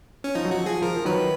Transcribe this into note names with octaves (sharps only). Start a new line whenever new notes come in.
C#4
F3 D#4
F#3
F3 F#4
F3 G#4
F3 A#4
F3
D#3 F#3 B4